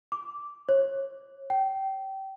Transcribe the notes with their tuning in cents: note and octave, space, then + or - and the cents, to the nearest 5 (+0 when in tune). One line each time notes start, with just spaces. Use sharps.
D6 -10
C#5 -30
G5 -25